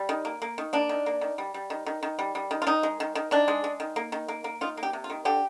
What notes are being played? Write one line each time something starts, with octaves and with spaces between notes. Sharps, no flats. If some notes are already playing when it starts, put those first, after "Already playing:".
Already playing: G3
D#3
A#3
A#3
D#3
A#3 D4
D#3
A#3
D#3
G3
G3
D#3
D#3
D#3
G3
G3
D#3
F4
D#3 D#4
G#3
D#3
D#3
D#3 D4
G#3
G#3
D#3
A#3
D#3
A#3
A#3
D#3 F4
A#3
G4
C3
F4
D#3
D3 G4